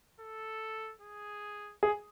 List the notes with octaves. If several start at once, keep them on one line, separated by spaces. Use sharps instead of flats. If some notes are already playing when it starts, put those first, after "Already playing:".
A4
G#4
G#4